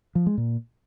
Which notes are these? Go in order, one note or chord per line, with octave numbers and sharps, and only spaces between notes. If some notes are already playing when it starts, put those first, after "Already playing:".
F3
G#3
A#2